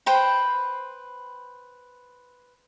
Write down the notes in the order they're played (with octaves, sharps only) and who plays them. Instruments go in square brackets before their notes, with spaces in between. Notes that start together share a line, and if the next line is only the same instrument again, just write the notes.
[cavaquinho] B4 C5 G5